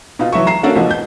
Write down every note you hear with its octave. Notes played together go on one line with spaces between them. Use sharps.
B2 D#4 F4
E3 F#3 E5 C#6
A#5 C7 E7
A#3 C#4 D4 F#4 A4 F5
A1 B2 F3
G6